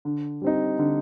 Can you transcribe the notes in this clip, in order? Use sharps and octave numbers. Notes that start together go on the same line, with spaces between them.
D3
G3 C4 D#4
D3